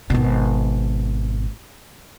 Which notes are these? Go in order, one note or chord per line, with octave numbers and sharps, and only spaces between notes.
G#1 B2